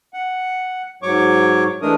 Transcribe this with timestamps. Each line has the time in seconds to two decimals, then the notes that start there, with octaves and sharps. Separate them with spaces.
0.14 F#5
1.03 G#2 F#3 C#5 C#6 D6
1.82 E3 G#3 A3 D4 A#4 D#6